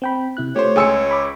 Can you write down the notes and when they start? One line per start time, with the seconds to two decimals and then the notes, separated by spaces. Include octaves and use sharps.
0.02 C4 G5 B5
0.37 C3 E4 F#6
0.56 A3 F4 G4 C5 C#5
0.76 C#2 G#4 G#5 C6 E6 C#7
1.11 B5 D6